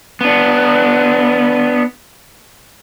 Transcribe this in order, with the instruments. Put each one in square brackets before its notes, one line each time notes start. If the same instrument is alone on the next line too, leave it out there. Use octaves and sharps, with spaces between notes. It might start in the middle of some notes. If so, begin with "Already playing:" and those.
[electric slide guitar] B3 D4